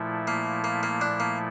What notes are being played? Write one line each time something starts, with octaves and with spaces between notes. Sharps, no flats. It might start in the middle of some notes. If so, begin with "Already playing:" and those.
Already playing: A#2 F3 A3 E4
A#3
A#3
A#3
D4
A#3